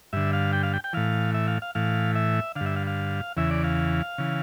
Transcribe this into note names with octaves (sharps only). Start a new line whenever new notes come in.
G2 D3 E5
F5
G5
F5
G5
G5
A2 E3 F5
E5
F5
F5
A2 E3 F5
E5
D3 F5
G2
E5
F5
F5
E2 C#3 E3 E5
D5
F5
C#3 E3